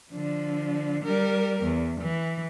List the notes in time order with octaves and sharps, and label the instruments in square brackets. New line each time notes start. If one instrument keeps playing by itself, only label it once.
[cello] D3 F3
G3 A#4
E2
E3